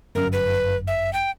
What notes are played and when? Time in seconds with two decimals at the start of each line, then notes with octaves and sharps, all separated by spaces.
0.15 G1 F#2 A#4
0.32 B4
0.87 E5
1.13 G5